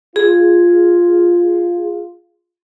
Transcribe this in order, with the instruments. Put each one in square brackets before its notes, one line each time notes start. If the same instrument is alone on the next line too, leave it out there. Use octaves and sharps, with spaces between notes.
[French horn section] F4 [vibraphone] G#4